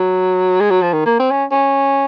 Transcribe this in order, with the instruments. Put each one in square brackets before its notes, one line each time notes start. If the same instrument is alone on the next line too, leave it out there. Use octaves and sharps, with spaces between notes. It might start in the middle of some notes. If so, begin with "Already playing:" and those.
Already playing: [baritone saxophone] F#3
G#3
F#3
F3
D#3
A#3
C4
C#4
C#4